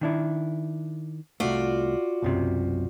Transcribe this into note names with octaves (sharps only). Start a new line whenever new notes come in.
D#3 D4 E4
C2 F#2 A3 F4 F#4 D5
B1 F#2 C3